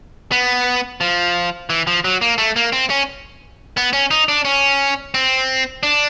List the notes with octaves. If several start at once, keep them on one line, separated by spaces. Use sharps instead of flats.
B3
F3
E3
F3
F#3
A#3
A3
A#3
C4
C#4
B3
C#4
D#4
D4
C#4
C4
D4